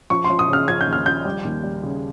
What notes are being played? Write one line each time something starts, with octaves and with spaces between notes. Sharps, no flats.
F3 C#6
C6
F3
D#6
C#3 F6
F3 G#6
G6
D#2
F6
F3 G6
G3
D#2
G3
C#3